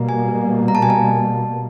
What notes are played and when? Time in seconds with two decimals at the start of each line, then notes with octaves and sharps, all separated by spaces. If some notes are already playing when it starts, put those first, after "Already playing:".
Already playing: B2 G3 A#3
0.09 G#5
0.68 A#5
0.75 A5
0.82 G#5
0.90 A5